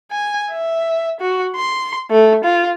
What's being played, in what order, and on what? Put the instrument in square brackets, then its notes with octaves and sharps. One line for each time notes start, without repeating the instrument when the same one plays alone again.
[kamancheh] G#5
E5
F#4
C6
A3
F4